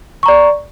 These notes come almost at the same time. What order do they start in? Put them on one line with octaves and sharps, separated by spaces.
C#6 A#5 D5